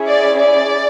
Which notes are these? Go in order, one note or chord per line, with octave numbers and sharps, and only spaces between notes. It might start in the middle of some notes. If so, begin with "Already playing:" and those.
Already playing: C#4 E4 G#4
D5
D5